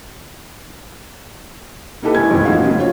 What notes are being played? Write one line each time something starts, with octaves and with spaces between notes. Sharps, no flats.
A#3 D#4 E4 G4 A4 B4
A1 G#3 E4 G#5 G#6
A#1 F2 B2 D#3 E3 G#3
F3 A#3 D#4 F#4 C5 F5
C#2 C#3 F#3
F4 C#5